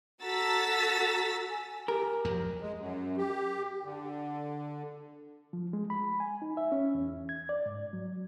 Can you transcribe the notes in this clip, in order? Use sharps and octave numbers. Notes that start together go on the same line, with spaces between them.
F#4 A4 A#5 E6 A6 B6
G#5
G4 A#4
F2 F3 F#3
G#3
F#2
G4
D3
F3
G#3
B5
G#5
D#4
E5
C#4
E2
G#6
D5
G#2
F#3